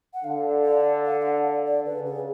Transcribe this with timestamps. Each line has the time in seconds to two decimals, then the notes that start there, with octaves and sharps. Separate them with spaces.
0.14 F#5
0.24 D3 F5
0.65 D5
1.05 F5
1.21 F5
1.25 F#5
1.45 D5
1.66 D5
1.86 C#3 B4
2.06 G#4